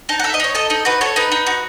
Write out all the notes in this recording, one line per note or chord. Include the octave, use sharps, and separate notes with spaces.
D#4 A5
F#5
A4 E5
D#5
D#4 C#5
A4 D#5
D#4 D#5
F#4 B4
A4 C#5
D#4 B4
D#4
F#4